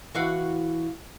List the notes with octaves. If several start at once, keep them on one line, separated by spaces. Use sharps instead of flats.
E3 F#4 F5